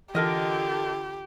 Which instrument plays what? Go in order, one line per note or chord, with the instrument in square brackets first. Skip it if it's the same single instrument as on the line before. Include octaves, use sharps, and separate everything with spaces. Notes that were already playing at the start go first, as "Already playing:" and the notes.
[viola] D3 F4 [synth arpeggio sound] E3 [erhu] G4 [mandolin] A4 A#4 D#5